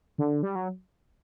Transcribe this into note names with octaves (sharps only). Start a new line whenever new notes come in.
D3
G3
F#3